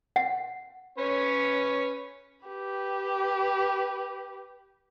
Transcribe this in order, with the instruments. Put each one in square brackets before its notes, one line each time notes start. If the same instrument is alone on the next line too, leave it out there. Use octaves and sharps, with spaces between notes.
[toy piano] F#5
[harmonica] C#4 B4 C#5
[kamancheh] G4 B4